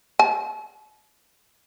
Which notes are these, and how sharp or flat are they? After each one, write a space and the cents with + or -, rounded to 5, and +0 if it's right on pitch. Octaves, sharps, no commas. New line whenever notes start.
A5 -45